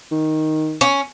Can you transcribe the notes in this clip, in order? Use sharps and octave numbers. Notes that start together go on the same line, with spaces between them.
D#3
C#4